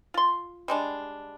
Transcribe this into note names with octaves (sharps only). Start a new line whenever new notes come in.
F4 C6
G3 G#3 D4